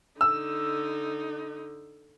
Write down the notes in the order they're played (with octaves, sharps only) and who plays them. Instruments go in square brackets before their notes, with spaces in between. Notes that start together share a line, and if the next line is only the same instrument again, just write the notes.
[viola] D3 D#4 [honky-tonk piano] E6